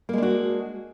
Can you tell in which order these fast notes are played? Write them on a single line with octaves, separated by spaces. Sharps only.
A#3 G#3 D4 F#4